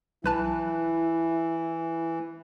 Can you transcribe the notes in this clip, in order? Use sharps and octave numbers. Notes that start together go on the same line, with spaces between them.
B1 E3 E4 B4 A5